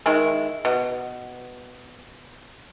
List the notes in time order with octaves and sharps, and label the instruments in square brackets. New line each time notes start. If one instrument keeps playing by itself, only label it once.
[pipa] D#3 G#3 E4
B2